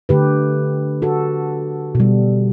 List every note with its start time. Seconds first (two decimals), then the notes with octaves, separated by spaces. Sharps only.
0.09 D3 A3 G4 B4
1.02 F#4 A4
1.95 B2 G3